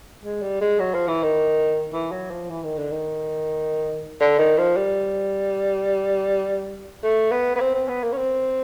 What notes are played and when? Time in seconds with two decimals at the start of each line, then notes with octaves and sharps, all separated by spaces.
0.24 G#3
0.42 G3
0.61 G#3
0.79 F#3
0.94 F3
1.08 E3
1.23 D#3
1.93 E3
2.12 F#3
2.31 F3
2.50 E3
2.64 D#3
2.78 D3
2.92 D#3
4.21 D3
4.39 D#3
4.58 F3
4.76 G3
7.04 A3
7.32 B3
7.56 B3
7.60 C4
7.75 C4
7.89 B3
8.03 A#3
8.13 C#4
8.17 C4